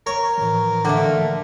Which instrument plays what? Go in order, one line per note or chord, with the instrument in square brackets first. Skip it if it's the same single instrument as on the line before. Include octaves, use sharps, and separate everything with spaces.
[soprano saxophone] A#4 [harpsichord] C#5
[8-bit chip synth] A2 E3 F3
[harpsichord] D3 [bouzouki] A3 A#3